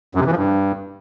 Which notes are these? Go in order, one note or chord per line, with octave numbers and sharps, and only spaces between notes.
F#2
C3
E3
F3
G2